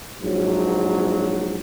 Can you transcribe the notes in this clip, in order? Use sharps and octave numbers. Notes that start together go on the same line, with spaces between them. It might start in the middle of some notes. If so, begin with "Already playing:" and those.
A#1 G#2 F#3